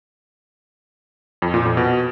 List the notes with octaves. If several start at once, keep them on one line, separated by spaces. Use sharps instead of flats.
F2
A#2
F2
B2